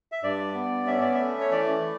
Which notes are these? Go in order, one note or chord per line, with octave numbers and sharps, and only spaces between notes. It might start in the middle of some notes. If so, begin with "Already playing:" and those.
E5
G2 D5
B3
C#4 E5
D5
A3 E5
C#5
E3 D5
E3